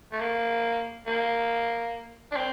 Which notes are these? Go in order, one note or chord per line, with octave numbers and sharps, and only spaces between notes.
A3
A#3
A#3
D4
C4